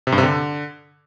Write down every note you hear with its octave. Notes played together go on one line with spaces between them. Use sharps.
C3
G2
C3
D3